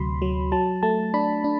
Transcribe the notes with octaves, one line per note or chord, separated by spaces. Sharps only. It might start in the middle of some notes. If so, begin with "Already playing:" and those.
Already playing: D2 C3 F#3 B5 C6
F#3
F#3 A5
A3 A5
D4 B5
D4